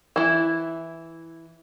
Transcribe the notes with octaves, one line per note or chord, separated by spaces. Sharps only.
E3 E4